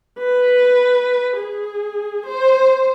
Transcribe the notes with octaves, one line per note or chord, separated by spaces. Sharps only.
B4
G#4
C5